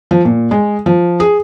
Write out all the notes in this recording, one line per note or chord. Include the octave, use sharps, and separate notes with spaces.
F3
A#2
G#3
F3
G#4